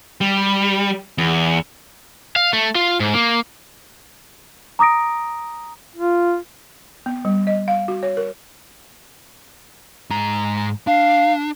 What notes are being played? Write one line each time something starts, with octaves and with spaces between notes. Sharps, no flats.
G3
E2
F5
A3
F4
G#2
A#3
A#5 D6 D#6 A#6 D7
F4
B3
G3
D#5
F5
F#4
C#5
A#4
G#2 A#5
D4 F5